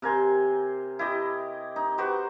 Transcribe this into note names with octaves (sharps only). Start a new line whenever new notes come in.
C3 A#4 G#5 C6
E4 G4 D#5
D#4
F#4 G4 B4 C5